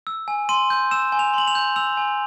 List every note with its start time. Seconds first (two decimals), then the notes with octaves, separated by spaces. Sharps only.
0.07 E6
0.28 G#5
0.49 C6 D#7
0.70 G6
0.91 E6 E7
1.12 G#5
1.19 F7
1.34 C6 F#7
1.48 F7
1.55 G6
1.76 E6 F7
1.97 G#5